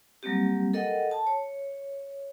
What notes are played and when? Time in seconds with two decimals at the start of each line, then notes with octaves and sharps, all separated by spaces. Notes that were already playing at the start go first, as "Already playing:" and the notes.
0.23 F#3 G3 A#3 C4 G4
0.73 A4 A#4 D#5 F#5 G5
1.11 A5
1.27 C#5